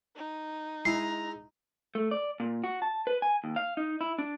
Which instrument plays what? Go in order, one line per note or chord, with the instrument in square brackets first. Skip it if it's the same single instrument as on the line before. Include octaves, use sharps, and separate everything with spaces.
[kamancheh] D#4
[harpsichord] G#3 E4 [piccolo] A#5 [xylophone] C7
[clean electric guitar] A3
D5
A#2
F#4
A5
B4
G#5
D#2
F5
D#4
E4
D4